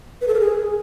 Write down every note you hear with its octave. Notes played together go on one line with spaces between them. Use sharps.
B4
A4
A#4
G#4